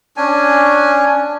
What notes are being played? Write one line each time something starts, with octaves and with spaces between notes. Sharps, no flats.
C#4 D4 G#5